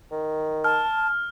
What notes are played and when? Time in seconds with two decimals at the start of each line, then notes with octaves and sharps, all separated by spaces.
0.11 D#3
0.64 A5 F6